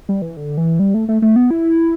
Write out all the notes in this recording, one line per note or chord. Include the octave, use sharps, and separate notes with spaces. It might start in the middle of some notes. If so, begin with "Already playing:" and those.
G3
E3
D3
E3
G3
A3
A3
A3
B3
E4